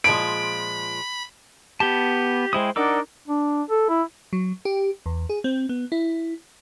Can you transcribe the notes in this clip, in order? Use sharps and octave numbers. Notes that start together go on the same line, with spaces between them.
A#2 F3 G#3 B5 D7
B3 G4 A5
G#3 E4 C5 G5 D#6
D4 D#4 A#4 D5 F#5 D6 E6
D4
A4
E4
F#3
G4
E2
G#4
C4
B3
E4